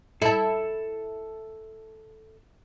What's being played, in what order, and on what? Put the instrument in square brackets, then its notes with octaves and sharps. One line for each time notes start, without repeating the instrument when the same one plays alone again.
[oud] E4 [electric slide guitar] A4 A5